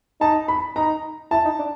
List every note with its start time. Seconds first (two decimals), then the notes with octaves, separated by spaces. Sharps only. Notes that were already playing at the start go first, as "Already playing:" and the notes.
0.21 D#4 A5
0.48 B5
0.76 D#4 A#5
1.31 E4 A5
1.45 D#4
1.59 D4